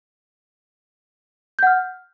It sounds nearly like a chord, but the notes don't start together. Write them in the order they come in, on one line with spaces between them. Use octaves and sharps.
G6 F#5 F6